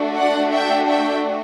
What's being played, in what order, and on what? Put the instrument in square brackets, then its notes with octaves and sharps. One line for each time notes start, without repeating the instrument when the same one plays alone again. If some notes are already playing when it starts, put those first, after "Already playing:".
Already playing: [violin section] A3 D4 F#4
D5 F#5
E5 G5
E5 G5